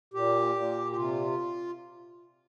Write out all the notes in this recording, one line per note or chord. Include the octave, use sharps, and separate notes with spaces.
A#2 G4
A#2
G4
C3 F4